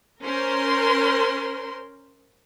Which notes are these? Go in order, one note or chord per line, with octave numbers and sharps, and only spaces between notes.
C#4 A#4 C5 C6